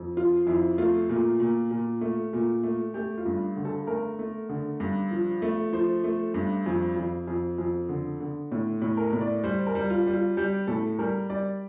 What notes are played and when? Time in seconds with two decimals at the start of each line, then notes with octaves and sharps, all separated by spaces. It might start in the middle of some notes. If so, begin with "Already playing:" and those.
Already playing: F2
0.17 F3 F4
0.47 F2 E4
0.78 A3 F4
1.09 A#2 F4
1.40 A#2
1.71 A#2
2.01 A3
2.33 A#2
2.63 A3
2.94 A3 G4
3.18 F4
3.26 G2
3.56 D3
3.65 A4
3.87 A3 A#4
4.19 A3
4.49 D3
4.80 G2
5.11 F3
5.42 A3
5.73 F3 C5
6.04 A3
6.34 G2
6.66 F2
6.96 F2
7.28 F2
7.58 F2
7.89 D3
8.20 D3
8.51 A2
8.82 A2
8.97 A#4
9.13 A2
9.21 D5
9.44 G3 C5
9.67 A#4
9.75 G3
9.90 F4
10.06 G3
10.13 F4
10.37 G3 G4
10.67 A2 A4
10.99 G3 A#4
11.30 G3 D5